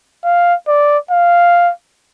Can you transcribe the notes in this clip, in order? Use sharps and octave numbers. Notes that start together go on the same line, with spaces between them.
F5
D5
F5